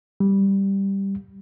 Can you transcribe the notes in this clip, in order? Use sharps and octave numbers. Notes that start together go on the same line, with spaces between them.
G3